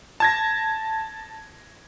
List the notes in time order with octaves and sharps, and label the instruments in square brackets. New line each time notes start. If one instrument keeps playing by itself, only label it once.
[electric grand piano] A5 G#6 A#6